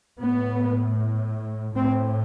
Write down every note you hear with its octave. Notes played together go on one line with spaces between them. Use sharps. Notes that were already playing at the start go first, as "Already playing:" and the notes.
A2 B3
A2 C4